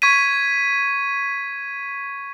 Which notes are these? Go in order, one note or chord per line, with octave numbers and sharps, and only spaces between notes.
C#6 G#6 B6 D#7